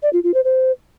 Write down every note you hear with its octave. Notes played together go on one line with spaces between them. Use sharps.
D5
F4
F4
C5
C5